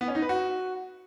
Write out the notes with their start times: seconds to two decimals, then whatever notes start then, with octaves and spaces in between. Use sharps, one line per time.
0.01 B3
0.08 C#4
0.15 D#4
0.22 B4
0.29 F#4